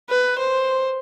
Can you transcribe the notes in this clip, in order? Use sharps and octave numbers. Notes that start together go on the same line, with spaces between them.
B4
C5